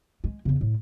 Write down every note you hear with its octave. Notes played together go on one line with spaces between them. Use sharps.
G#3
E2 C#3
A2